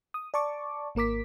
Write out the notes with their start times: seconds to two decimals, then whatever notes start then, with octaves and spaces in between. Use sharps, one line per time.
0.14 D#6
0.34 D5 A5 C#6 D6
0.95 G#1 A#3 A#4 D6 B6